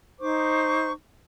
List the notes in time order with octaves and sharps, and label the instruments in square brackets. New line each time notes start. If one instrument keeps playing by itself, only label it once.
[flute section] D#4 C5 C#6 D6